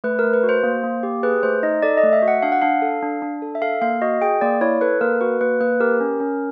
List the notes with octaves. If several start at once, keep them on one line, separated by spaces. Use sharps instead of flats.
A3 B4
A3 A#4
B4
F#4
C5
A#3
A#3
G4
G#4 B4
A3 C5
D#4 D#5
A4 D5
D#5
A3
E5
F#4
F#5
D4 F5
F#5
D4 F5
A4
D4
D4
A4
E5
A4 F5
A#3 F5
F#4 D#5
G#4 G5
A#3 D5
E4 C#5
A4 B4
A#3 A#4
F#4 B4
A#3 B4
A#3 B4
G4 A#4
C#4
C#4